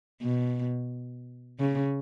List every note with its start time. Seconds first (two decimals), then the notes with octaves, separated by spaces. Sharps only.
0.22 B2
1.60 C#3